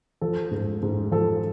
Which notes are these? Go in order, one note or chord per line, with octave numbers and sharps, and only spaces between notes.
F3 A4
G#2
G#2
F3 A4